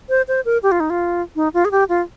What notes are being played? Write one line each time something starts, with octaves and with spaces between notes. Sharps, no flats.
C5
C5
A#4
G4
F4
D#4
F4
D#4
F4
G#4
G4
F4